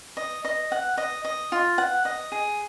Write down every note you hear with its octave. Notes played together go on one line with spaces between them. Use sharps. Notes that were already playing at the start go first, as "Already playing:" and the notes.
D#5
D#5
F#5
D#5
D#5
F4
F#5
D#5
G#4